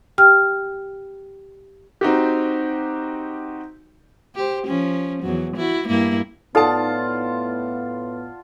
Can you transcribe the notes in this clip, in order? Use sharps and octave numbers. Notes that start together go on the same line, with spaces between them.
G4 G5 F6
C4 D#4 F#4 G4
G4 C5
F3 C#4
E2 F#3
E4 F#4
G2 A#3 E4
A2 B3 D#4 F4 A4 D5 F#5 A5